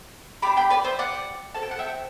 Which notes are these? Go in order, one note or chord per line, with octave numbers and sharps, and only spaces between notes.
D4 G4 B5 D6
G5 B5
B4 D5
C5 E5
D5 F#5
C4 F#4 A4 A5
G5
F#5
E5 G5